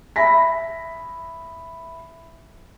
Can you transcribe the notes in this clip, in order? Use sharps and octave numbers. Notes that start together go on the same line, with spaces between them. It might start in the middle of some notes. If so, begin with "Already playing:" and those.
E5 B5 A#6 B6